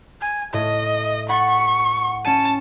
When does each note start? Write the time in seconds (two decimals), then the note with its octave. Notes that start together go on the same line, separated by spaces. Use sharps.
0.21 G#5
0.53 A2 D#5
1.29 F#5 B5 C#6 A6
2.25 C#4 A5 C#7 D#7